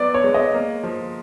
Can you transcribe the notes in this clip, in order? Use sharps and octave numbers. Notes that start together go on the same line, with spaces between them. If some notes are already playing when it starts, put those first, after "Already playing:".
Already playing: F#3 B3 D5
C#5
G#3
D#5
A#3
F3